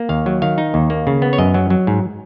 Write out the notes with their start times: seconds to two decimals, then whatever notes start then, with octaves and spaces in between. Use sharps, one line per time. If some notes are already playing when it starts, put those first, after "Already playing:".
Already playing: A#3
0.09 D#2 F5
0.26 F#3
0.42 D#3 F5
0.58 D#4
0.74 D#2
0.90 A#3
1.07 C#3
1.22 B3
1.33 C#5
1.38 F#2 D#5
1.54 F#3
1.70 F#3
1.87 G#2